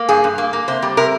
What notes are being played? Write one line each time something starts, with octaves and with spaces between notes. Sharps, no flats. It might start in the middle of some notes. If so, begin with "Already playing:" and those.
Already playing: A#3
G2 G#4
G2
A#3
A#3
C3 C5
G3
C3 A#4